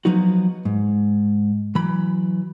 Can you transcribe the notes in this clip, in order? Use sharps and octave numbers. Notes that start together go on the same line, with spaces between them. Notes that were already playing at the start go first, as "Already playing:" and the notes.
F3 F#3 B3 D#4 F#4
G#2
E3 F#3 B5